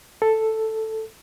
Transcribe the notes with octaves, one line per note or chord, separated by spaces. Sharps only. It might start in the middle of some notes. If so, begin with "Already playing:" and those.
A4